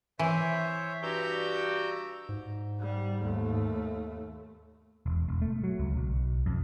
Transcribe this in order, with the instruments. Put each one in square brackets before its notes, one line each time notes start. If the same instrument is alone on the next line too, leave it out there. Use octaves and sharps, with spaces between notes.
[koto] E3 [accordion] C5 C#5 E5
[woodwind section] G2 F#4 G4 [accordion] A#5 E6 G6
[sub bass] G#2
[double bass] G3
D#2 A3
[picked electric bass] E1
E1
A3
F#3
C#2
B1
F2